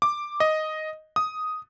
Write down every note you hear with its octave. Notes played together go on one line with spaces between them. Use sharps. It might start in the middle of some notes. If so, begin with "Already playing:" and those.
D6
D#5
D#6